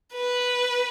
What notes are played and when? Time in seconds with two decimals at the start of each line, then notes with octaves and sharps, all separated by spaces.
0.14 B4